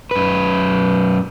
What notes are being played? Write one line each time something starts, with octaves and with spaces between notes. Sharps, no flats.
F#2 B4